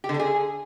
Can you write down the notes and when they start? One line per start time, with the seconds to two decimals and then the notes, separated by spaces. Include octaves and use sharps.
0.04 G4
0.09 D3
0.14 D4
0.19 G#4